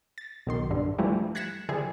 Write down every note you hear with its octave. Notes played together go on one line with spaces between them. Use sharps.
A6
B1 D#3 C6
G2 D3
E3 F3 G3 A3
F#6 G#6 A#6 B6 C#7 E7
D3 F3 E4 G4 G#4